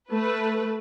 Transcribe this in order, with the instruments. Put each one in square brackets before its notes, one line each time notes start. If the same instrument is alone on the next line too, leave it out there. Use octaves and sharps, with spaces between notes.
[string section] A3 B4